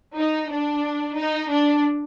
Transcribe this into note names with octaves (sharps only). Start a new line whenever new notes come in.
D#4
D4
D#4
D4